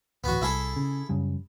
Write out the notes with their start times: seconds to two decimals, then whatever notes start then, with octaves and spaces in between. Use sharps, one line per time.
0.24 D1 A1 B3 F#4
0.42 C2 E4 G#4 A4
0.76 C#3
1.09 F#2 C#3 G3